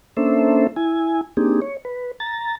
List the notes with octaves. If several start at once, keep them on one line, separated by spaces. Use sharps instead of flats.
A#3 C#4 D4 A4 C5 E5
E4 G#5
A#3 C4 D4 D#4 G4 G#4
C#5
B4
A#5 A6